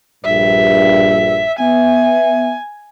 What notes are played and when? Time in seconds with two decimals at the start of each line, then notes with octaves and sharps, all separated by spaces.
0.25 A#1 G2 E5
1.59 B3 E5 G#5